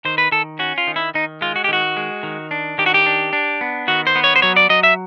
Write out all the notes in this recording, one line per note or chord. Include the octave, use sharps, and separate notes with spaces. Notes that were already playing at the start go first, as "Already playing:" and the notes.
D#3 C5
B4
D#3 A4
C#4 F#4
F4
D#3
E4
D#3 D#4
G#3 F4
F#4
G4
D#3 F#4
G#3
D#3
D4
D#3 G4
F#4
G4
D4
D4
B3
D#3 F#4
C5
B3
C#5
C5
F#3 C#5
D5
F#3 D#5
E5